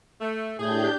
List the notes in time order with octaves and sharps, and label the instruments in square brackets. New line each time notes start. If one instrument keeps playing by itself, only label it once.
[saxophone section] A3
[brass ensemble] A2 [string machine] D4 G4 G6 [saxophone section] G#4